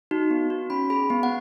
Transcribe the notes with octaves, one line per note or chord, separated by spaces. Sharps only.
D#4 F#4
B3
F#4
C#4 B5
G#4 B5
B3
F#5